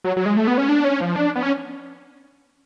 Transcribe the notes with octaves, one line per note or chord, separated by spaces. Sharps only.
F#3
F#3
G#3
A3
B3
C#4
D4
C#4
F3
D4
B3
C#4